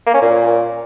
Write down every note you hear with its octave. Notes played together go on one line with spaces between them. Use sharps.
A#3
C#4
A#2